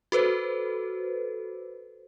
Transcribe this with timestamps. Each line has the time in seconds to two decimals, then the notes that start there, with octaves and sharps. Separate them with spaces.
0.12 F#4 A4 B4 C5